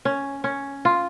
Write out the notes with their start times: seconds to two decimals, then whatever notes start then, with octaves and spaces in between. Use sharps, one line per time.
0.05 C#4
0.44 C#4
0.85 F4